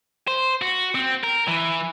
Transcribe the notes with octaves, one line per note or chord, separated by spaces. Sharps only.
C5
F#4
C4
A#4
E3